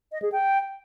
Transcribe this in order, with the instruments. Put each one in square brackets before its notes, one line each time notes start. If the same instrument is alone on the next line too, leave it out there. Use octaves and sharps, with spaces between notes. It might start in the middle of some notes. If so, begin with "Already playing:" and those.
[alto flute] D#5
G#4
G5